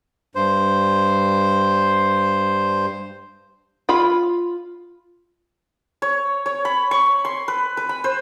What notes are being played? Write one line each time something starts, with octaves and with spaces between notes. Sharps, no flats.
G2 C5
F4 B5
C#5
C#5
B5
C#6
C6
B4
B4
B5
C5